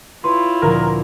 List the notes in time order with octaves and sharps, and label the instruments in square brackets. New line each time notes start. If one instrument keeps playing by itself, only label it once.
[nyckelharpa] E4 F4 [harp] B4 C#5 [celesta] C6
[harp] D2 A#2 F3 [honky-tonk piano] A#4